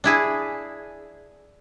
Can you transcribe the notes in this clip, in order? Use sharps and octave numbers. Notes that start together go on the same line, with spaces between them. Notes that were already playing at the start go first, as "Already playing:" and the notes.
D4 E4 G#4